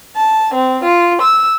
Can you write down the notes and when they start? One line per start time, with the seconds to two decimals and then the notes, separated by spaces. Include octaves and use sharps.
0.15 A5
0.52 C4
0.83 F4
1.20 E6